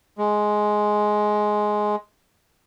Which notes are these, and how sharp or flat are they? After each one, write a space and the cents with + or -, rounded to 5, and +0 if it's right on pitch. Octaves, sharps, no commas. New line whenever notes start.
G#3 +10